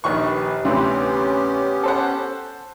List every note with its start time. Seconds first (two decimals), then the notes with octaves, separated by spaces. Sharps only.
0.04 A#1 D#2 D#3 B4 C#6
0.65 D2 C3 E3 B3 C#4 G4
1.83 A4 C5 F#5